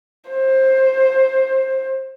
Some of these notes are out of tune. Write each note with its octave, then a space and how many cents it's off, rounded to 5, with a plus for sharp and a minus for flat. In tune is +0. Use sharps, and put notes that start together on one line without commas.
C5 +15